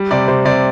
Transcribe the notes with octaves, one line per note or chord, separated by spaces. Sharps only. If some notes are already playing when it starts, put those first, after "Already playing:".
Already playing: G3
C3 D5
C3 C5
C3 D5